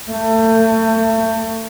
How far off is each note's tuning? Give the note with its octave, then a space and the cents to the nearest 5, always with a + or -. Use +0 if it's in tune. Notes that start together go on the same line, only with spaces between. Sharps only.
A3 +30